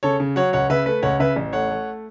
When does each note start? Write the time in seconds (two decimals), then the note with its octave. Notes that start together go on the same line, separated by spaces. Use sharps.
0.03 C#3 A4 C#5
0.20 C#3
0.36 F#3 C#5 F#5
0.53 C#2 C#5 F#5
0.70 C#3 B4 E5
0.86 A3 B4
1.03 C#2 C#5 F#5
1.20 C#3 B4 E5
1.36 A1
1.53 A3 C#5 F#5
1.70 A3